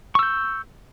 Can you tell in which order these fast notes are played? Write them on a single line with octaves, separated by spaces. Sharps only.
C#6 E6 G6